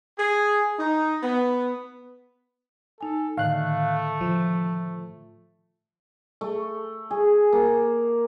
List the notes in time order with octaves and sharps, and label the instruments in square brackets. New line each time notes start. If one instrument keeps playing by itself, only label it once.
[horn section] G#4
D#4
B3
[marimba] D#4 G#5 [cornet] A4
[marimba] A2 D3 D#3 [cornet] A3 [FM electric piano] F5 F#6
[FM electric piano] F3
[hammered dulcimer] A3
G#4
A#3